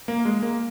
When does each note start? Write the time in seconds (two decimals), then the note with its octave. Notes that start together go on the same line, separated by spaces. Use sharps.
0.08 A#3
0.25 G#3
0.42 A#3